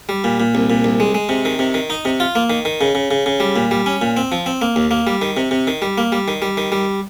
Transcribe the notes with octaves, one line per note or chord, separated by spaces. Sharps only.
G3
A#2
A#2
C2
A#2
C2
G#3
G#3
C3
D#3
C3
D#3
D#4
C3
F4
A#3
D#3
D#3
C#3
C#3
C#3
C#3
G3
A#2
G3
C#4
A#2
C4
F3
C4
A#3
D#2
A#3
G3
D#3
C3
C3
D#3
G3
A#3
G3
D#3
G3
D#3
G3